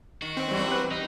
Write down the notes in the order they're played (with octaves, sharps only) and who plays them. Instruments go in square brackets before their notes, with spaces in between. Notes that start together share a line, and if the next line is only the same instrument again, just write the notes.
[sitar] D#3 [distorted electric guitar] F#4
[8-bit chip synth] C4
[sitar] E3 F#3 A#3 [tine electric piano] G3
[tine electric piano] G4 B4
[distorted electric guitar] D#4 [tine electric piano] D#5